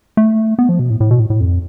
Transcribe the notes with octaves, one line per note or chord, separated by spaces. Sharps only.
A3
B3
F3
B2
A2
A2
B2
A2
A2
F2